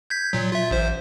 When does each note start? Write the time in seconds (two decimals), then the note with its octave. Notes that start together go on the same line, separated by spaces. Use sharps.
0.10 G6 G#6 B6
0.33 A#2 F#3
0.52 F4 E5
0.71 A1 C5